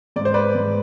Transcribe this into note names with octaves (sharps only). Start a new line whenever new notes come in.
G#2 D5
C5
B4 D5
G#2